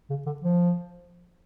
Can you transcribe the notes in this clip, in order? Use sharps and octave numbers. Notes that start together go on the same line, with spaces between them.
C#3
D3
F3